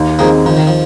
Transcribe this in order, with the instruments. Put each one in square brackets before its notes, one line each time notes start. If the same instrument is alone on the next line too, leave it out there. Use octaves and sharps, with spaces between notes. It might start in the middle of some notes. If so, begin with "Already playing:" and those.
Already playing: [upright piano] D#2
[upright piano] D#3 C4 D#4 G#4 [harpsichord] F3 A#3
[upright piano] D#3 [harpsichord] F3
[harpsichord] D#3
F3